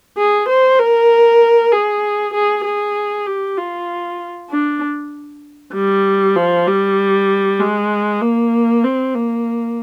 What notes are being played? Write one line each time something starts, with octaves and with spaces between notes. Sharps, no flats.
G#4
C5
A#4
G#4
G#4
G#4
G4
F4
D4
G3
F3
G3
G#3
A#3
C4
A#3